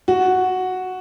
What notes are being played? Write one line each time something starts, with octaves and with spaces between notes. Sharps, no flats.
F#4